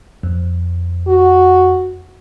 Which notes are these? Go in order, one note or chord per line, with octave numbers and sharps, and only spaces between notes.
F2
F#4